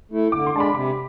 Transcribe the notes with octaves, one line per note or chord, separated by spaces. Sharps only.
A3 E4
D3 D6
C6
G#3 D4 A5
B5
C3 B5